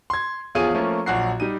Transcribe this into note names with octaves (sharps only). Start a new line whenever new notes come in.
C6 G#6
E2 F3 F4 G#4 C#5 D#7
F3 A3 A#3 C#4
A#1 F#3 F#4 F#6 C7
G3 D#4 D#7